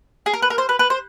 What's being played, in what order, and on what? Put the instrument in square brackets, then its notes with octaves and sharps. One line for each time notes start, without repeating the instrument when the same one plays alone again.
[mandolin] G#4
A#4
B4
A#4
C5
B4
B4
C5